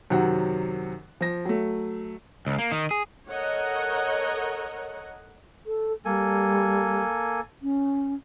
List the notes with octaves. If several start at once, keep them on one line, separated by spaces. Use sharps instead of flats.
F#2 C3 D#3 F#3 F#5
F3 A#6
F#3 A3
C#2
A#3
D#3
G#4
A4 A#4 C#5 D#5 F#5
A4
G3 A#3 A4 G#5
C#4